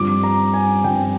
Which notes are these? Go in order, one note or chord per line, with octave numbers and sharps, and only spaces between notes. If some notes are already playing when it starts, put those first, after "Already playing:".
Already playing: G2 F3 C4 D6
A#5
G#5
G2 F3 C4 G5